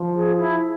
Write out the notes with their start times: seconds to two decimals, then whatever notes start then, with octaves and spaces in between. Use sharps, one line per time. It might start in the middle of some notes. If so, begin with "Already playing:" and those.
Already playing: F3
0.16 G#4
0.39 E4